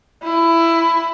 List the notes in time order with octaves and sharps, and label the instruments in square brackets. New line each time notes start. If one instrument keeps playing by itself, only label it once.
[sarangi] E4